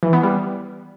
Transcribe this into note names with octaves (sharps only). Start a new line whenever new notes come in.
E3
B3
G3